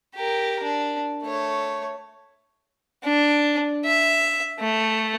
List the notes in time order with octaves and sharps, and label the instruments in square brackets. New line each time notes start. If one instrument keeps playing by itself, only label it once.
[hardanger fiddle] G4 A#4
D4
A3 C#5
[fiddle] D4
E5
A3